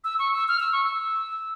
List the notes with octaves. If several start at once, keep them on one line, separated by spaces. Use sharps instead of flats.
E6
C#6
E6
F6
E6
C#6
E6